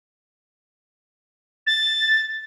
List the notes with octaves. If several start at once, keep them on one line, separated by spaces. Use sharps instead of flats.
A6